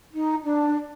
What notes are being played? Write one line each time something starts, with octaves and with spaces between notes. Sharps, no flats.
D#4
D4